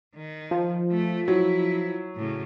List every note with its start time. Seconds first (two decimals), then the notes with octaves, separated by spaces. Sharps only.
0.15 D#3
0.51 F3
0.91 A3
1.28 F#3 E4
2.15 A2 C#3